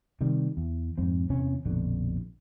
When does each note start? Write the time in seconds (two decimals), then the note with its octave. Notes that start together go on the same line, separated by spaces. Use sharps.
0.21 C3 D#3 G3
0.57 E2
0.98 F2 G#2 C4
1.30 E2 C3 B3 C#4
1.66 A#1 F2 B2 D3